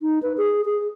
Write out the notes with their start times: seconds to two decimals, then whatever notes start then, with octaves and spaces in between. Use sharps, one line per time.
0.02 D#4
0.22 B4
0.37 G#4
0.65 G#4